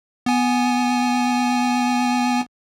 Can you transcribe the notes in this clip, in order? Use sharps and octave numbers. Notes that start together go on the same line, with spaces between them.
B3 G#5